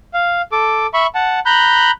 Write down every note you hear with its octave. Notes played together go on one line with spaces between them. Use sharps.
F5
A4 D6
E5 B5 C#6
F#5 A5
A#5 B5 F#6 G6